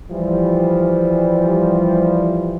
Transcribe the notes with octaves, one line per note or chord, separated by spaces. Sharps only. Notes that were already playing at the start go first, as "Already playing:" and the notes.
E3 F3 G3